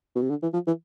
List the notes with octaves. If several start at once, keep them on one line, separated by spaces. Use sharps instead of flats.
B2
C3
D3
E3
F3
E3